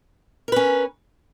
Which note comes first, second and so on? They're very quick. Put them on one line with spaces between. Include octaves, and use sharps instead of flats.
A#4 B4 C#4